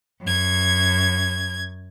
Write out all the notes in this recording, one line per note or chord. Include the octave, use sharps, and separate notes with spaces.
F#2 G#6